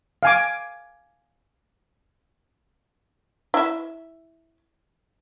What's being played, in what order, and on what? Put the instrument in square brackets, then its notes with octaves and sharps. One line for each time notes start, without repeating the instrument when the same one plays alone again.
[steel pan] F5 G#5 D6
[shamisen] E4 E5